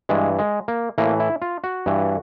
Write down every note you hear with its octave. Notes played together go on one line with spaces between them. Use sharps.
G2 E3 G#3
G#3
A#3
A2 E3 A#3
E4
F4
F#4
G2 E3